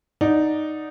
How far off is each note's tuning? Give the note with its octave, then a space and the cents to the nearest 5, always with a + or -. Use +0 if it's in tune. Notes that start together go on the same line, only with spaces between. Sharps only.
D#4 -5 D5 +0 F#5 -30